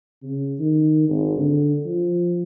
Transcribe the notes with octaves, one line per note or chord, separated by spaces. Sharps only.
C#3
D#3
G#1
D3
F3